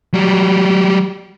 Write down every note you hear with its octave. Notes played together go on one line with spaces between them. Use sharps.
F#3 G3